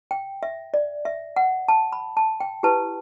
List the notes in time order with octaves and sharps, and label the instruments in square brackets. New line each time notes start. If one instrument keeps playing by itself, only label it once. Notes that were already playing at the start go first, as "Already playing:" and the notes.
[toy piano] G5
E5
D5
E5
F#5
A5
B5
A5
G5
E4 G4 B4 A5